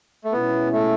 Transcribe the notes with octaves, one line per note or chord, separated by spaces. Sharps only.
A3
B2 G#3 B3 C#4 E4
A3